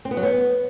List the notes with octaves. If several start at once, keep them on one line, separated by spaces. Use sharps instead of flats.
C4
B3
F#3
B3